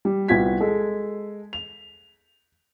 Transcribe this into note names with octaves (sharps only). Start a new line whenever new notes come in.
G3
C2 B3 F4 F#4 G#6 B6
G#3 A4
F7